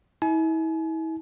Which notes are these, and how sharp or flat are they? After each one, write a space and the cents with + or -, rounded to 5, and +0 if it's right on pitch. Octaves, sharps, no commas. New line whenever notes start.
E4 -40 G#5 +40